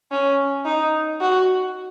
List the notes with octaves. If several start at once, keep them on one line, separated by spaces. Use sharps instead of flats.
C#4
D#4
F#4